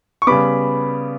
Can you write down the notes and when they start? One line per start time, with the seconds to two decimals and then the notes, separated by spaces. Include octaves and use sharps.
0.22 C#6
0.27 C#3 G3 B3 B5 D6